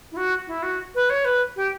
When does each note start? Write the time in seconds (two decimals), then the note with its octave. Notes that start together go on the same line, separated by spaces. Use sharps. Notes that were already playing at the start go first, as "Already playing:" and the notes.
0.12 E4
0.17 F#4
0.47 E4
0.63 F#4
0.95 B4
1.10 C#5
1.25 B4
1.56 G4